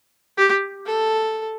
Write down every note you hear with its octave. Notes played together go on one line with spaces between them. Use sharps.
G4
A4